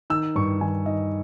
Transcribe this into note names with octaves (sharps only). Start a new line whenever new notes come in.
D#3 E6
G2 C#6
D#3 G#5
D#3 D#5